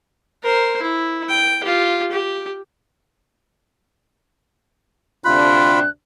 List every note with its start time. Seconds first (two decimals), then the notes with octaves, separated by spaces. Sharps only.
0.43 A#4 C5
0.82 E4
1.28 G5
1.64 F4 G4
2.11 G4
5.25 D2 C3 D4 F4 B5 F#6